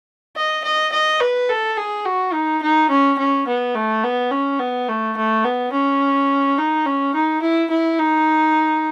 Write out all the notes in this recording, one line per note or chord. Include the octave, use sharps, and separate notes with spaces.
D#5
D#5
D#5
B4
A4
G#4
F#4
D#4
D#4
C#4
C#4
B3
A3
B3
C#4
B3
A3
A3
B3
C#4
D#4
C#4
D#4
E4
E4
D#4